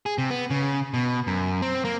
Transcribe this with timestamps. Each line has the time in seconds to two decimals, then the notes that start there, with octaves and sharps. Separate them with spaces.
0.06 G#4
0.18 C3
0.30 B3
0.50 C#3
0.94 B2
1.27 F#2
1.62 C4
1.85 A#3